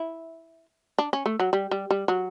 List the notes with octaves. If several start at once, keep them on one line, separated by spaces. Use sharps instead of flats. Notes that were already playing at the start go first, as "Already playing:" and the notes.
Already playing: E4
D4
C#4
A3
F#3
G3
G3
G3
F#3